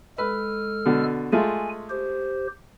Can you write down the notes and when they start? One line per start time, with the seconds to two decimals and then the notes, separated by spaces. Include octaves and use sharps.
0.18 G#3 A4 B4 F6
0.86 B2 D3
1.32 G#3 A3 F4 G#5
1.90 G4 C5